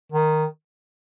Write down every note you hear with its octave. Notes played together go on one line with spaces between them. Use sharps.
D#3